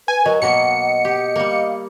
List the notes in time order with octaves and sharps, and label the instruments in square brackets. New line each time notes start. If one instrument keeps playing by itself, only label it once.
[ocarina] B4 [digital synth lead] G#5
[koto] F#3 [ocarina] A#4 [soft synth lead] D#5
[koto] B2 F#3 A#3 [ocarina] F#5 [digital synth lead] C#7
[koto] G4
G3 A#3
[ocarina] F5